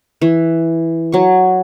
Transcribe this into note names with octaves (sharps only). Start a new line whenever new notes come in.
E3
F#3 C#6